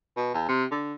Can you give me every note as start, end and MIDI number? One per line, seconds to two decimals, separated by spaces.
0.17 0.29 47
0.34 0.46 40
0.49 0.65 48
0.71 0.94 50